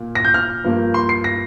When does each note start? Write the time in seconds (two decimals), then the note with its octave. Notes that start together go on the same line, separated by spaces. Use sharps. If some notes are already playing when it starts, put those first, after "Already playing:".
Already playing: A#2 A#3
0.15 A#6
0.25 G6
0.34 F6
0.64 G2 F3 A#3
0.94 C6
1.09 C7
1.24 A#6